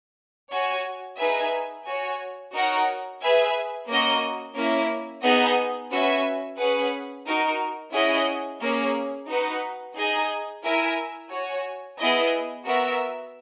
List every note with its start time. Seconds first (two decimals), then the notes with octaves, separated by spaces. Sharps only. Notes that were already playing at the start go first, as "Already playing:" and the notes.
0.51 F#4 C#5 G#5
1.19 D#4 G#4 B4 E5 G#5
1.86 F#4 C#5 G#5
2.54 D#4 F#4 A#4 C#5 F#5
3.21 G#4 B4 E5 G#5
3.88 A#3 C#4 F#4 A#4 D#5
4.56 A#3 C#4 E4
5.23 B3 D#4 G#4 D#5 F#5
5.91 C#4 F#4 B4 E5 G#5
6.58 C#4 G#4 B4 F#5
7.26 D#4 F#4 A#4
7.94 C#4 E4 G#4 D#5 F#5
8.61 A#3 C#4 G#4 C#5
9.28 D#4 F#4 B4 F#5
9.96 D#4 G#4 D#5 G#5
10.63 E4 A#4 E5 G#5
11.31 F#4 C#5 G#5
11.98 B3 E4 G#4 D#5 G#5
12.66 B3 F#4 A#4 E5